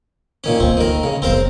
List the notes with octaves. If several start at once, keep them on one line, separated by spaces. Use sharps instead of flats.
A#2 D#3 C#4
D2 A#3 C4
D#3 A#4
C#3
F1 B3 C4 A#4 C5